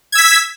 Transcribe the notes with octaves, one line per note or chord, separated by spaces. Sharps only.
E6 G#6 B6